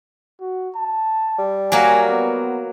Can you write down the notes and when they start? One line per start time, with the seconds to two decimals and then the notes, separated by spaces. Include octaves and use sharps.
0.41 F#4
0.76 A5
1.39 G3
1.72 F#3 A#3 G#5
2.10 B3